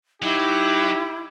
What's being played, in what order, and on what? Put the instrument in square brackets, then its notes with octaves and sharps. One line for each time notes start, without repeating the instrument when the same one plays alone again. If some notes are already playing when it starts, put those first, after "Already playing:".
[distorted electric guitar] F#3 [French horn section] D#4 [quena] E4 [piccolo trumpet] G4